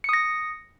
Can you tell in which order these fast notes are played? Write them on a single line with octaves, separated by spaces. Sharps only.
C#7 D#6 A#6